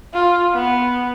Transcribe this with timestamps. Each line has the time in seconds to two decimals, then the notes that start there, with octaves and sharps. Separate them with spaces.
0.13 F4
0.54 B3